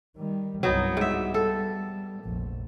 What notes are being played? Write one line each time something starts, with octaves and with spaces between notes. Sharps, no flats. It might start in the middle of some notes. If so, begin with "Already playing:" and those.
D#3 G3
C2 G2 F#3 B3 D#4
G#2 G3 E5
A4
F1 A#1